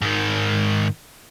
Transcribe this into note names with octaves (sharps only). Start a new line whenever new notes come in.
G#2 D#3